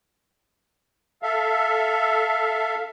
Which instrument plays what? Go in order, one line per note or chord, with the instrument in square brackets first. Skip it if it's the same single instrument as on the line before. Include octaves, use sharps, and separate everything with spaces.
[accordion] A4 E5 F5